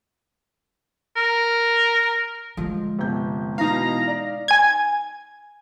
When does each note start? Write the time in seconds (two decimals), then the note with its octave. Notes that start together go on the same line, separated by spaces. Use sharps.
1.16 A#4
2.57 D3 F3 G#3
2.99 G1 C3 G6
3.58 B2 E3 D#4 F5 A#5
4.08 D5
4.48 G#5 G#6